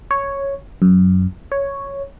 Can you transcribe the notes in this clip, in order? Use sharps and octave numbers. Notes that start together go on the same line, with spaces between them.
C#5
F#2
C#5